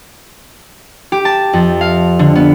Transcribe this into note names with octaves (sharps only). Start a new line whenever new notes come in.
G4
A5
F2
F5
D3
B3